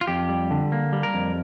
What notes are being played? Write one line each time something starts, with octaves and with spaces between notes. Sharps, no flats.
F4
F2 G4
G3
D3
A#3
G3
A#4
F2